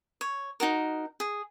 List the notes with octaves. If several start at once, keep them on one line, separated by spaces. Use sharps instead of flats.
C#5
D#4 F#4 A#4
G#4